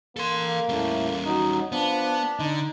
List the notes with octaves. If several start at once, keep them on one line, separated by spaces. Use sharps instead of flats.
A#3 A4 C6
A2 G3 A3 C#4
F#3 D#4
F3 B3 D4
D3 D#4